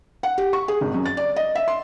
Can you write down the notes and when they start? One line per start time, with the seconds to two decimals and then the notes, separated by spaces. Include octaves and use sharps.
0.23 F#5
0.38 G4
0.53 C#6
0.68 G#4
0.81 G#1
0.94 F#2
1.06 A6
1.17 D5
1.36 D#5
1.55 E5
1.68 C6